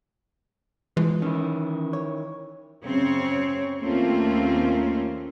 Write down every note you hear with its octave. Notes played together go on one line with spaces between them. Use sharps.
B2 E3 F3 G#3
D#3 C#4 E4
C#5
F#2 C#3 C4 C#5
D#2 A3 A#3 C4 C#4 F4